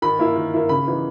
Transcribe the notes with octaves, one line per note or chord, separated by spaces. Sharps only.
D#3 B5
A#3 E4
D#3
A#3 E4
C#3 B5
E3 B3 D#4